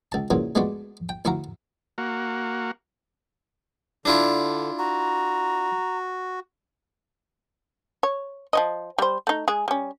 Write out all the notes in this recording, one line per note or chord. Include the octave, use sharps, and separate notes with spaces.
C#2 A5
A#2 C#3 E3 F#3
G#3 A3 B3 D4 F#4
G5
D2 E4 F#4 F5 A#5
A#3 F#4
D3 D4 E4 F4
F#4 A#5
C#5
F3 C#5 D#5
G3 C5
A3 D#4
G#3 G#4
G3 C#4